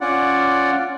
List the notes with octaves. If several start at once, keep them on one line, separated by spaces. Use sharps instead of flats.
C#4 F4 D5 F#5